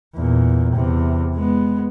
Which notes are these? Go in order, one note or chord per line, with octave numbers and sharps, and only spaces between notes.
E2 A#2
E2 C3
G#3 B3